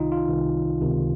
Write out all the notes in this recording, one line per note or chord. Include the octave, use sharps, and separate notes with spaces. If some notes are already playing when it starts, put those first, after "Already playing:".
Already playing: C2 C3 D#3 D#4 F4
F4
C2 C3 D#3
C#2 C3 D#3